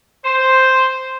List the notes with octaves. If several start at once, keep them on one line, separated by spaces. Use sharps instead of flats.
C5